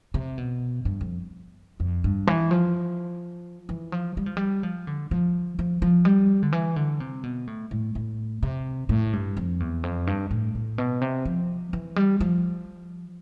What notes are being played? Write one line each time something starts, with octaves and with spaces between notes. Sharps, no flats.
C3
B2
G2
F2
F2
G2
E3
F3
E3
F3
G3
F3
G3
F3
D3
F3
F3
F3
G3
D3
E3
D3
C3
B2
A2
A2
A2
C3
A2
G2
F2
E2
F2
G2
A2
A2
B2
C3
F3
E3
G3
F3